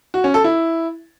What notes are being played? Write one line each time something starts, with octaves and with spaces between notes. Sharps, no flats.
F#4
C#4
A4
E4